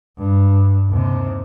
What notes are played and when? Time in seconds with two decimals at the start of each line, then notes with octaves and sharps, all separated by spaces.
0.17 G2
0.89 D#2 C3